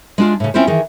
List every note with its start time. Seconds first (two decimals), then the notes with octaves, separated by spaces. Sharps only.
0.18 G#3 D4 F4
0.40 A2 C#3
0.54 C4 C#4 E4 F4 C5
0.67 D#3 E3 G#4